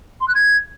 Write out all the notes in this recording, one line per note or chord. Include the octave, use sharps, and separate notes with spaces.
C6
F#6
G#6